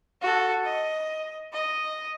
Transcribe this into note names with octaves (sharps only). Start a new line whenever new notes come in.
F#4 A4
D#5
D#5